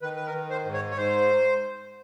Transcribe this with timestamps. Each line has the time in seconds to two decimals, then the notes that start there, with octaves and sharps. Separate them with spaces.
0.02 D#3 B4
0.16 B4
0.26 A#4
0.34 D#3
0.50 C5
0.65 G#2
0.74 C#5
0.91 C#5
0.97 G#2 C5